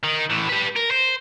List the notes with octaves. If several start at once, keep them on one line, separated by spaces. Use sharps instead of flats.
D#3
A2 E3
G4 B4
A#4
C5